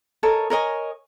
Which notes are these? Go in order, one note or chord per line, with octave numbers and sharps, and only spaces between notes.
A4 A#4 C#5 D#5
A#4 C#5 D#5 G#5